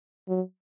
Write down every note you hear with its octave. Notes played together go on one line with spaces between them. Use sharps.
F#3